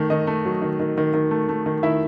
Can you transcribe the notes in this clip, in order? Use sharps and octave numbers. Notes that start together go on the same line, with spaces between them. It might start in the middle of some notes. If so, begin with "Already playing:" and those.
Already playing: D#3 A3
D#3 D#5
A3
F#3
D#3
D#3
D#3
D#3
A3
A3
D#3
D#3 E4 E5